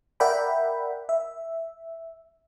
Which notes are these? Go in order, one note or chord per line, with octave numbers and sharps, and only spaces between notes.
A#4 D5 E5 F#5 G5 B5
E5